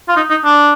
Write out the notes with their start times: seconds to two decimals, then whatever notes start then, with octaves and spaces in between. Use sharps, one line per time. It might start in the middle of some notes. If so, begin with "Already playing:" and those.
0.09 F4
0.17 D#4
0.30 D#4
0.45 D4